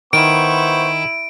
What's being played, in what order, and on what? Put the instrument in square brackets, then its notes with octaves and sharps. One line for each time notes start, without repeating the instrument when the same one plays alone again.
[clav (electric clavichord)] D#3 [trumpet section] B3 C5 C#6 [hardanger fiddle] E4 [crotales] D7